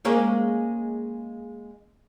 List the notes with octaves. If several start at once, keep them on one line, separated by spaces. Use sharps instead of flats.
G#3 A#3 C#4